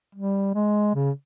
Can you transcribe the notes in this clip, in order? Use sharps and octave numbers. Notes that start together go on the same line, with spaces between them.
G3
G#3
C#3